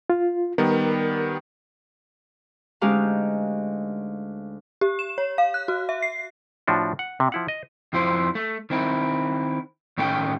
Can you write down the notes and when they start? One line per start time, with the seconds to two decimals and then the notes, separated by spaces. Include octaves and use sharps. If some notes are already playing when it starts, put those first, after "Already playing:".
0.10 F4
0.58 D#3 G3 B3 A#4
2.81 D2 G#3 C#4 D#4 G4 F5
4.81 G4
4.99 E7
5.18 C#5
5.38 F5
5.54 F#6
5.68 F#4
5.89 E5
6.02 C7
6.67 A2 F3 D4 F#4
6.99 F#5
7.20 C3
7.32 F3 E4 F#5
7.48 D#5
7.93 F2 F3 E4 C5
8.35 A3
8.70 D#3 C4 E4
9.98 A2 D#3 A3 C#4 C5 G5